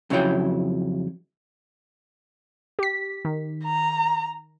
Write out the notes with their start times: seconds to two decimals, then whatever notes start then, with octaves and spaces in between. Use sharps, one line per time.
0.10 F2 C#3 F#3 E4 C#5 G5
2.79 G4 B6
3.25 D#3
3.65 A#5